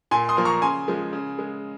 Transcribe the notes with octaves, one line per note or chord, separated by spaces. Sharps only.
A#2 G#5 C6
C6 D#6
F3 A#3
A#5 C#6
C#3 G#5 C6
F3 G#3
C#3
G#3